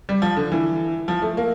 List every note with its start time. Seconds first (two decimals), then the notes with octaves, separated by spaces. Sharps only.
0.09 G3
0.22 F3
0.36 D3
0.52 E3
1.08 F3
1.22 A3
1.37 A#3